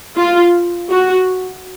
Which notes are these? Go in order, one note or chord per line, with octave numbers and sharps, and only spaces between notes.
F4
F#4